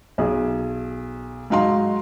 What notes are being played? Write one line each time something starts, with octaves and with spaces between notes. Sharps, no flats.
B1 G#4
G#2 F#3 D#4 F5 A#5 C6